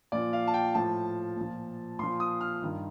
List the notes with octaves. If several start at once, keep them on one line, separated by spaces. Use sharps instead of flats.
A#2 F3 D5
F5
A5
G5
A2 F3 A5
A#2 F3
A#2 F3 C6
D#6
F6
G2 D#3